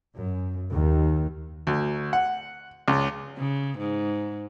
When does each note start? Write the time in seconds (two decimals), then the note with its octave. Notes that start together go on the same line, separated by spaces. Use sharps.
0.17 F#2
0.71 D#2
1.67 D2
2.13 F#5
2.88 C#2
3.38 C#3
3.78 G#2